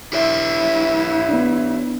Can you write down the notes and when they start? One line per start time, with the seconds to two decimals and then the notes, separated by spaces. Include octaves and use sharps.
0.13 E4 G4 C#5 E5
1.29 B3 D4